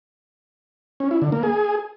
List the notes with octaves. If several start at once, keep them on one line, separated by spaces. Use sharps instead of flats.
C#4
E4
D3
A#3
G#4